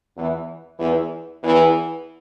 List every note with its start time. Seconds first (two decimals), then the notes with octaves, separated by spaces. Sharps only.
0.17 E2 E3
0.80 E2 E3
1.43 E2 E3